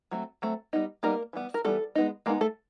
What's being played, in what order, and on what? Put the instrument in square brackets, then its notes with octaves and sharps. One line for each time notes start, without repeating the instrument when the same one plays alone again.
[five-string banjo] F#3 A3 C4
F#3 A3 C4
G3 B3 D#4
G3 A#3 B3 D#4 A#4
E3 G3 B3
A#4
E3 G3 A3 B3 A4
G#3 B3 D#4
G#3 A#3 B3 D#4 A#4
A3 A4